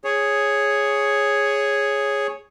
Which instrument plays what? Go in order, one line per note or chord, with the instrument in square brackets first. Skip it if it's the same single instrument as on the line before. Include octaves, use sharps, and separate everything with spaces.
[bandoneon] G#4 C#5